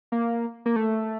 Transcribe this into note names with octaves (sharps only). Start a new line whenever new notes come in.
A#3
A#3
A3